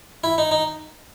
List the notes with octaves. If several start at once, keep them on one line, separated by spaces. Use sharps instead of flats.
E4
D#4
D#4